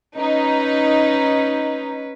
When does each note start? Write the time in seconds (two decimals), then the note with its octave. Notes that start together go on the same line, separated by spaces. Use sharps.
0.18 C#4 D#4 B4